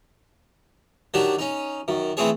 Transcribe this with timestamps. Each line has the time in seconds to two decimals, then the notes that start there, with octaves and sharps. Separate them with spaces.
1.14 D#3 F#3 D4 F#4 G4
1.39 C#4 D#4
1.88 F#2 D#3
2.17 E3 A3 C4 G#4 C#5